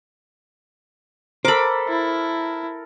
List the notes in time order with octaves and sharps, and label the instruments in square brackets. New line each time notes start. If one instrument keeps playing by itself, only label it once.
[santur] A4 A#4 [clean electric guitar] C5 [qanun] B5 D6
[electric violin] E4